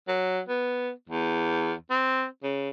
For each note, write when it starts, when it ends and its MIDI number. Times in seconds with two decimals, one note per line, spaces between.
0.08 0.40 54
0.48 0.91 59
1.09 1.72 40
1.90 2.25 60
2.43 2.69 49